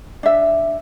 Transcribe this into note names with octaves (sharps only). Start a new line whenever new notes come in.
D4 E5